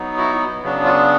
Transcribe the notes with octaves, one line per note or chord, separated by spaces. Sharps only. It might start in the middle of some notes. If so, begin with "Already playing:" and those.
Already playing: F#3 B3 D#4
E4 F#4
C#3 F#3 B3 D4
F4